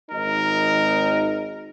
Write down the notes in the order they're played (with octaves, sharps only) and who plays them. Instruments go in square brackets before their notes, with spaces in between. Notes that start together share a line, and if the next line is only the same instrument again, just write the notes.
[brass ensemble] G#1 D#4 [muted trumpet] A#4